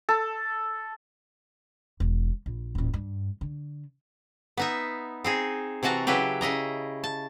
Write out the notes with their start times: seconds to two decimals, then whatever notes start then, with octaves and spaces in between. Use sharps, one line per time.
0.09 A4
2.00 E1
2.46 A#1
2.75 D#1 A1
2.94 G2
3.41 D3
4.57 B3 D#4 E5
5.24 C4 D#4 G#4
5.83 C3 E3 F#4 A5 A#5
6.07 C#3 F#3 E4 G4 B4 G5
6.41 C#3 E4 D#5 A#5
7.04 A5